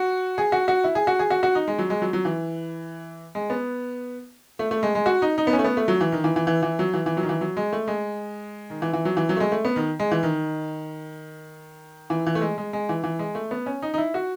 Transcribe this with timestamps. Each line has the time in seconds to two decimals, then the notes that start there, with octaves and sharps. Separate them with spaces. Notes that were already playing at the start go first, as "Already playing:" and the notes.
Already playing: F#4
0.38 G#4
0.52 F#4
0.68 F#4
0.84 E4
0.95 G#4
1.07 F#4
1.19 G#4
1.30 F#4
1.43 F#4
1.55 D#4
1.68 G#3
1.78 F#3
1.90 G#3
2.02 F#3
2.13 F#3
2.25 E3
3.35 G#3
3.50 B3
4.59 A3
4.71 A3
4.83 G#3
4.95 G#3
5.06 F#4
5.22 D#4
5.38 D#4
5.47 B3
5.53 C#4
5.59 A3
5.64 B3
5.77 A3
5.88 F#3
6.01 E3
6.12 D#3
6.24 E3
6.36 E3
6.47 E3
6.63 E3
6.79 F#3
6.94 E3
7.06 E3
7.17 F#3
7.23 D#3
7.29 E3
7.41 F#3
7.57 G#3
7.73 A3
7.88 G#3
8.70 D#3
8.82 E3
8.93 E3
9.05 F#3
9.17 E3
9.29 F#3
9.37 A3
9.40 G#3
9.52 A3
9.65 B3
9.76 D#3
9.99 G#3
10.11 E3
10.23 D#3
12.10 E3
12.27 E3
12.35 A3
12.41 G#3
12.58 G#3
12.73 G#3
12.89 E3
13.04 E3
13.19 G#3
13.35 A3
13.51 B3
13.66 C#4
13.82 D#4
13.94 D#4
13.98 E4
14.14 F#4